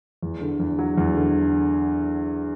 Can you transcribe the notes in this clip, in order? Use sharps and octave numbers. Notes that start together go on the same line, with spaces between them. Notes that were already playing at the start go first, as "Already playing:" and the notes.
E2
D3
E2
F#3
E2
D3